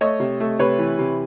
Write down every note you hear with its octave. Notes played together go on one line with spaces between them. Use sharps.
A3 C#5 D#5
C3
A3
C3 B4 C#5
E3
C3